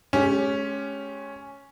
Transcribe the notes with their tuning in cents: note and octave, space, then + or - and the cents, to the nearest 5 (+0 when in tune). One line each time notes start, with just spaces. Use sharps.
G#3 +40 C#4 +0 G4 +0